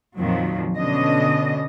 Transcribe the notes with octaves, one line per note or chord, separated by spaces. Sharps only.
F2 A#2 D#3 F3 F#3
B2 D3 C#4 D4 D#5